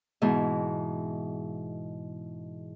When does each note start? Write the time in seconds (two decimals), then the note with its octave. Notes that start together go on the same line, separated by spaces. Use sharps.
0.22 G#2 B2 E3